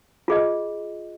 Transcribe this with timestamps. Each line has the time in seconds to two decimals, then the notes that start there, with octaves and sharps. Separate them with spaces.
0.28 F4 G#4 D#5